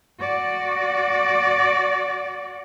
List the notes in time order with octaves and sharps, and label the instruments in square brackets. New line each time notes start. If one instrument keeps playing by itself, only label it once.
[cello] F#4 D5